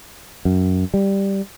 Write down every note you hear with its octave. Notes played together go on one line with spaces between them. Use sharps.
F#2
G3